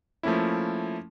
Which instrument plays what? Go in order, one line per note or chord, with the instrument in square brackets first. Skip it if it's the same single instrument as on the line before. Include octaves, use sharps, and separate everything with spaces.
[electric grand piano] F3 A3 A#3 C#4 E4